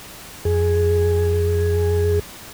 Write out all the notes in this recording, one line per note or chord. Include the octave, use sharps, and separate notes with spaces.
F2 G#4